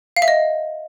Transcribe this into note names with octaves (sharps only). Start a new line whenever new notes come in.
F5
E5
D#5